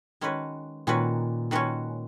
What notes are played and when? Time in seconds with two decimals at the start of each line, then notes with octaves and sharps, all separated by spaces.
0.21 D#3 G#3 C#4 F#4 B4
0.87 A#2 D#3 G#3 C#4 F#4 B4
1.51 D#3 G#3 C#4 F#4 B4